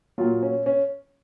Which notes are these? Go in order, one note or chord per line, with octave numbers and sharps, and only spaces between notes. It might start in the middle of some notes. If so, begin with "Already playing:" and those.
A#2 F#3 F4
C#4
C#4